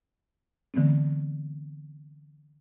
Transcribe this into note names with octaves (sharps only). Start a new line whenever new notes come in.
D3 E3 A3 B3 C4